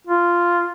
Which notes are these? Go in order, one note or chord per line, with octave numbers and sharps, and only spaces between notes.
F4